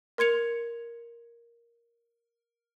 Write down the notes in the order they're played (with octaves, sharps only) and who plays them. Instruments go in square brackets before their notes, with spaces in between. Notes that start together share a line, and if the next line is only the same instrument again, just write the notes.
[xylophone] A#4 C6 G#6 C#7 F7